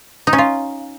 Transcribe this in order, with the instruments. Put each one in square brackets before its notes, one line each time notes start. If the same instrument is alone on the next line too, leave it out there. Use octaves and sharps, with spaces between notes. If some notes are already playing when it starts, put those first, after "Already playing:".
[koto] D#4
C#4
F4